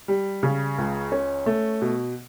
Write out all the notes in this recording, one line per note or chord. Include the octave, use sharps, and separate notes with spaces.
G3
C#3
C#2
C#4
A3
B2